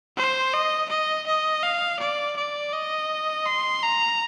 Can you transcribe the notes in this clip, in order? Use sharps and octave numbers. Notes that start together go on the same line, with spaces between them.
C5
D#5
D#5
D#5
F5
D5
D5
D#5
C6
A#5